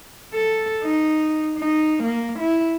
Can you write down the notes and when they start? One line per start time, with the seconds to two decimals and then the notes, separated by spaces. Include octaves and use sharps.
0.34 A4
0.83 D#4
1.58 D#4
2.03 A#3
2.40 E4